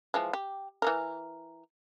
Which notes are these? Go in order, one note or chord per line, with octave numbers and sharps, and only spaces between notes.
E3 F3 G#3
G4
E3 G#3 A#4